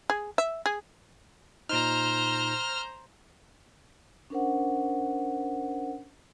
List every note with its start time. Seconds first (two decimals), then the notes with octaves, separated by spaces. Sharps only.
0.10 G#4
0.38 E5
0.66 G#4
1.69 A#2 D#4 C5 A#5 F6
4.30 C#4 D4 A#4 C5 F#5